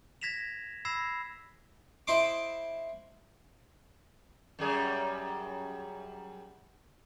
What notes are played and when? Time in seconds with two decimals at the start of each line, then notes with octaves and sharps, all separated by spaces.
0.21 G#6 A#6 B6 E7 F7
0.85 B5 E6 G#6 A#6 C7 E7
2.07 E4 C5 D#5 C6 D6
4.59 F#2 G3 G#4